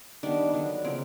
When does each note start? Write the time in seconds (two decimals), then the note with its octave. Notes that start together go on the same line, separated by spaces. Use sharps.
0.23 D#3 G3 B3 D4
0.53 D3 F#3 B3
0.85 C#3 F3 A#3 C4